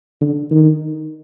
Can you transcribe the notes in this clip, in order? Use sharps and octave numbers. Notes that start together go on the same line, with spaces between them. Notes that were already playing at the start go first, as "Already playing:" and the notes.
D3
D#3